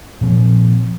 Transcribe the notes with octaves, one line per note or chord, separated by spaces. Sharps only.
A#2 F3 C4